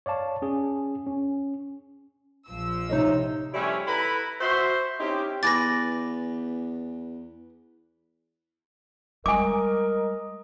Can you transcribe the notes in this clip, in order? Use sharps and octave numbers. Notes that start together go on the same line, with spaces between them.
C#5 D5 F5 A5
C#4 G#4
C#4
A#1 F3 E6
C3 D#4 C#5 D#5
F3 G3 A3 C#4 E4 G4
E4 A4 B4 A#5 B5
F#4 C5 E5
C4 C#4 D#4 E4 G4
E2 B4 G#5 D6 A6 A#6
G3 G#3 A#4 D#5 G#5 D6